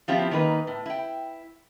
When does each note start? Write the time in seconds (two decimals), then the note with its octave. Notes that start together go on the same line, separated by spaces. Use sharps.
0.08 F3 B3 C4 E4 F4 G4
0.31 D#3 A#3 D#4 B4
0.67 A2
0.86 E4 G5